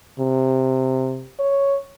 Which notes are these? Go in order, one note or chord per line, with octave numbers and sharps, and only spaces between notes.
C3
C#5